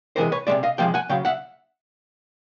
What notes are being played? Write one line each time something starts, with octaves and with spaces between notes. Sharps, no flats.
C3 E3 G#3 A#4 C5
B4 C#5
C3 F3 G#3 D5 E5
D#5 F5
C3 F3 G#3 F5 G5
F#5 G#5
C#3 F#3 F5 G5
E5 F#5